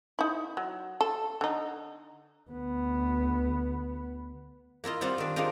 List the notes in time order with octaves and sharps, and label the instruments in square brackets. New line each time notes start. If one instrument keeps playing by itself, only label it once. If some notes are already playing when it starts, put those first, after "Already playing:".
[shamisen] D#4 E4
F#3
A4
D3 D#4
[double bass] D2 B3
[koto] A#3 E4 F4 D#5
G3 C4 F4 C5 F#5
D#3 D4
F3 G#3 D4 F4 G4 A#4